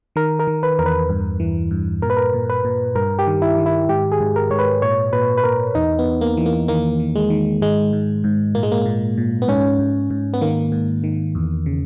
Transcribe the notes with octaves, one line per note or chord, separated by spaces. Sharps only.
D#3 A#4
A#4
D#3
B4
E2 A#4
B4
G2
E3
G2
A#2 A#4
B4
A#4
A#2
B4
A#2
G2 A#4
G4
D#3
E4
D#3
E4
G#2 G4
G#4
G#2
A#4
G#2 C#5
B4
A#2 C#5
A#2 B4
B4
A#2 A#4
E2 D#4
B3
E2
A#3
E3
A#3
D#3 A#3
D#3
G#3
D#3
G#2 G#3
G#2
G#2
A#2 A#3
G#3
A#3
A#2
A#2
B3
G#2 C#4
G#2
G#2
B3
D#3 A#3
G#2
D#3
E2
C#3